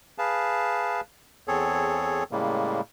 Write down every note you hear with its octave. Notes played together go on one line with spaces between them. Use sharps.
G#4 B4 F5 A5
E2 C4 G#4 A4 C#5
A2 C#3 G3 G#3 A#3